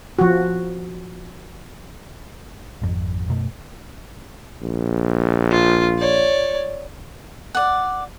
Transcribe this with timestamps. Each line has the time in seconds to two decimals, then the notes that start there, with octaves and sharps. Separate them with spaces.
0.19 F3 F#4
2.82 G#1 F2
3.29 F#2 B2 A3
4.62 A#1
5.50 F4
5.99 C#5 D5
7.55 D5 F#5